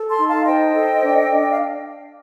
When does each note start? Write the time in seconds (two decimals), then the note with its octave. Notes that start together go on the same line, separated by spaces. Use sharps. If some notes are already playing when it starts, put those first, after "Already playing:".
Already playing: A4
0.09 A5 C6
0.18 D#4
0.28 F5 A5
0.46 C5 D#5 G5
0.75 A4
1.03 D4
1.30 D4
1.51 F5